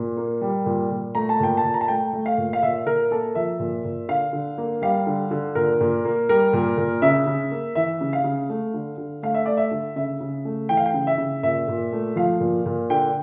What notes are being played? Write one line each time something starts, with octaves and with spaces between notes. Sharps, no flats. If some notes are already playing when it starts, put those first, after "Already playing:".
Already playing: A#2
A#3
G3
A#2
A#2
A3 A#5
A5
A#2 G5
A5
A#2
A#5
A5
A3 G5
A3
F5
A#2
F5
A#2 E5
A#2 A#4
A#3 A4
F3 E5
A#2
A#2
D3 F5
D3
A#3
G3 F5
D3
D3
A#2 A#4
A#2
A#3
G3 A#4
A#2
A#2
C#3 E5
C#3
A#3
E3 E5
C#3
F5
C#3
A3
D3
D3
A3 F5
E5
A3 D5
E5
D3
C#3 E5
C#3
A3
E3 G5
F5
G5
C#3
E5
C#3
A#2 E5
A#2
A3
F3 F5
A#2
A#2
D3 G5